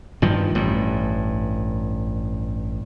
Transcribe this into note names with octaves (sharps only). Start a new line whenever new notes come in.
G2 D#3 F3
A1 G2